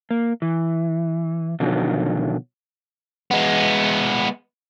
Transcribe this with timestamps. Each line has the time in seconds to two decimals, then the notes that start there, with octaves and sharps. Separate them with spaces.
0.11 A#3
0.42 E3
1.60 B2 D3 D#3 F3 F#3
3.31 G#3 B3